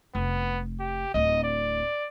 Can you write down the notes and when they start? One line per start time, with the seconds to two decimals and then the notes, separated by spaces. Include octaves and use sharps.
0.15 F1 B3
0.80 G4
1.14 D1 C4 D#5
1.44 D5